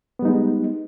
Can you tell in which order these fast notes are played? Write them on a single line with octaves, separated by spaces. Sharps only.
B3 G3 D#4 G#3